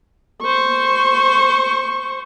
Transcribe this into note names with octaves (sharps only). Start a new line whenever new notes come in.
C5 C#6